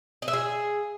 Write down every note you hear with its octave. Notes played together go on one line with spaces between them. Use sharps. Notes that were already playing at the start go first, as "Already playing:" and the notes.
D#5
E5
G#4